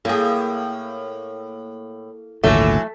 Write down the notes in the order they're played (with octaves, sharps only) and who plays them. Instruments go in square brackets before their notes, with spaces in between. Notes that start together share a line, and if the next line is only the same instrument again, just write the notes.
[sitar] A2 [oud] A#3 G#4
[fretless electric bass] G#1 D2 A#2 [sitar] E3 F#3 [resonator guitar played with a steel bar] A3